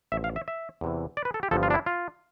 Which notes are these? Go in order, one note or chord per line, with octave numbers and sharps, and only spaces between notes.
A1 A2 F3 E5
F5
E5
E5
E2 C3 E3
D5
B4
A4
G4
G1 G2 F3 A4
F4
D4
E4
F4